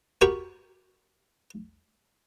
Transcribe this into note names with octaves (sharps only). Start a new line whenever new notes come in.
F#4 G4 A#4 G5 B5 C#6